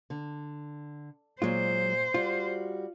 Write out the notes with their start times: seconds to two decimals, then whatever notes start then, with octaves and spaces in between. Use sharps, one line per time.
0.10 D3
1.42 A#2 F#3 G#3 F4 C5
2.14 G3 F4 F#4